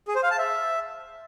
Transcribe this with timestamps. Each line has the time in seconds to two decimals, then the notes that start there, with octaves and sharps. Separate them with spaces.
0.08 G#4
0.16 C5
0.23 F5
0.31 A5
0.39 E5